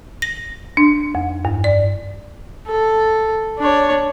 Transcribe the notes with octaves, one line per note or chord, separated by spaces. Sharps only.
A#6
D4
F2
G2
D5
A4
D4 C#5